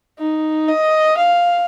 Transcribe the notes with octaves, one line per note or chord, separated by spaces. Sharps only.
D#4
D#5
F5